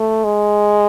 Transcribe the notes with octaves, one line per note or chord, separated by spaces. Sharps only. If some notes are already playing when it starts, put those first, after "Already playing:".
Already playing: A3
G#3